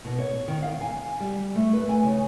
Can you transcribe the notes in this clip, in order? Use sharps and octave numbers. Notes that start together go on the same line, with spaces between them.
B2
C#5
D#3
F5
G#5
G3
A3
B4
G#5
C#3